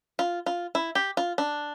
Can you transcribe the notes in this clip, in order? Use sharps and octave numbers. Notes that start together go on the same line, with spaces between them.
F4
F4
E4
G4
F4
D4